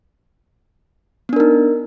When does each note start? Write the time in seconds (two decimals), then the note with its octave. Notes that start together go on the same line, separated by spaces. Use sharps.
1.29 B3
1.33 D4
1.36 A#4
1.40 D#4